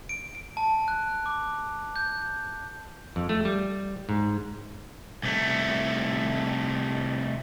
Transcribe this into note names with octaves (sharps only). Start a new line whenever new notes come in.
D7
D7
A5
F#6
D6
G6
F2
A3
G3
G#2
C2 A3